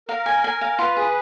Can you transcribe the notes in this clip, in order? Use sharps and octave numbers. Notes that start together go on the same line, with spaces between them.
A#4 F5
G#5
G#5
F5
F4 B4
G#4